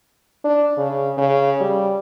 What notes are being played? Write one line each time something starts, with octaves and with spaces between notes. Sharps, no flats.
D4
C#3
C#3
G3